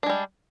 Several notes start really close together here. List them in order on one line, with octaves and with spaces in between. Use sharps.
D4 G#3 G3